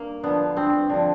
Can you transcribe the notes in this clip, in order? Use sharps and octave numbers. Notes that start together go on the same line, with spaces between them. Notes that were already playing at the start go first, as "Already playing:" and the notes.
Already playing: G2 A#3
D3 F3 B3
G2 C4
D3 F3